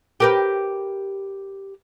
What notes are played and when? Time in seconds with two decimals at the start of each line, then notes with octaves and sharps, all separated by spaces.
0.20 G4 A#4 B4